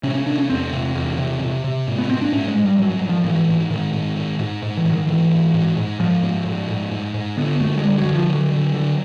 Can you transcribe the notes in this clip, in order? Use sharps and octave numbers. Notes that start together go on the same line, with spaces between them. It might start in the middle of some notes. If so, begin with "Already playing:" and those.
C3 C#4
C#4
C3 D4
C#4
E2 C4
C3
E2
C3
C3
C3
G#2
B3
G#2 C4
D4
G#2 C#4
G#3
G#2
G3
G#2 F#3
F#3
G#2
F3
G#2 E3
G#2
G#2 D#3
G#2
G#2
G#2
G#2
E3
G#2
D#3
G#2 E3
G#2
G#2
G#2
G#2 F3
G#2
G#2
G#2
G#2
G#2
D3 B3
F#2 A3
G#3
D3 G3
F#3
D3
F3
D3 F#3
D3
D3